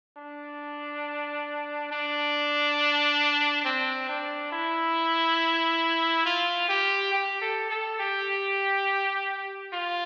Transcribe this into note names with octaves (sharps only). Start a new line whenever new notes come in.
D4
D4
C4
D4
E4
F4
G4
G4
A4
A4
G4
F4